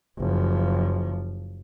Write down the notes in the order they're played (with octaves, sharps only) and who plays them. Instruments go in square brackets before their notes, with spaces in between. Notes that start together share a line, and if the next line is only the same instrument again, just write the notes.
[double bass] F#1 F3